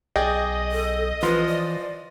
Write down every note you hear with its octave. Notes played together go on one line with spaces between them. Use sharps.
B1 G#4 D5 D#5 G5
A4
E3 F3 F4 B4 C6
D5